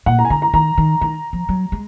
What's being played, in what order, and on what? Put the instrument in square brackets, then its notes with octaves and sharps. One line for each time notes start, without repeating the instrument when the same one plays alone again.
[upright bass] A#2 [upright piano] F#5
[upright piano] A#5
G#5
[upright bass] D3 [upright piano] A#5
[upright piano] A#5
[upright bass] D#3 [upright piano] A#5
[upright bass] D#3
[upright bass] D#3 [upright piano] A#5
[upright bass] F3
F#3
G#3